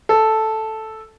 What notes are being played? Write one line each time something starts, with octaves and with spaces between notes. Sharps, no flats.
A4